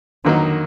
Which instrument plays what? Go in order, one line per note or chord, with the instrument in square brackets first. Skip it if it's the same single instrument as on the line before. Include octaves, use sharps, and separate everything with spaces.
[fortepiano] F2 D3 F#3 A#3 D#4 [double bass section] D#3